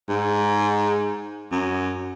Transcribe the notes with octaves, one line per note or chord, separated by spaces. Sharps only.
G#2
F#2